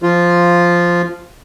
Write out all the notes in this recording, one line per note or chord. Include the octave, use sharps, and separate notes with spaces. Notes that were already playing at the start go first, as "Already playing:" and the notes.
F3 F4